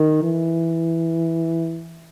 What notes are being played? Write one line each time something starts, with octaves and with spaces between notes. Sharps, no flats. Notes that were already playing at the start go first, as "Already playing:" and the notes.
Already playing: D#3
E3